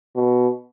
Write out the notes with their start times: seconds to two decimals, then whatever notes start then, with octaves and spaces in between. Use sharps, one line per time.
0.16 B2